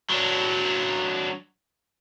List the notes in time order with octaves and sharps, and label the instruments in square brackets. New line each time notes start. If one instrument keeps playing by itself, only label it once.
[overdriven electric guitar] F#3 D4